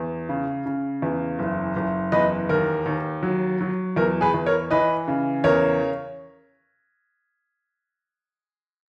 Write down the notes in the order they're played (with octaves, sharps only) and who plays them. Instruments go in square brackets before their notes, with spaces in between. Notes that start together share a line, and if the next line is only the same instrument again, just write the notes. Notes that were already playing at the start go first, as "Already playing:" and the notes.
Already playing: [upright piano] E2
C#3
C#3
E2
F#1
F#1
E2 B4 D#5
D#2 A#4
D#2
F#3
F#3
E2 A#4
G#4 B4
E2
A#4 C#5
E3 B4 D#5
C#3
E2 A#4 C#5